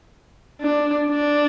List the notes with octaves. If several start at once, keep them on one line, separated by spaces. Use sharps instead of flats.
D4
D4